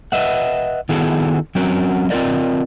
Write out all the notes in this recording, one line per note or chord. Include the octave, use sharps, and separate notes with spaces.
B4 D#5 E5 F#5
D#3 B3 E4 F#4 G#4 A4
F#3 C4 C#4 F#4 A#4
C4 F4 G4 A#4 D5 D#5